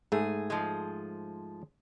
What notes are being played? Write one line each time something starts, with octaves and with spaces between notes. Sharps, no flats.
G#2 A3 G#4
F3 G#3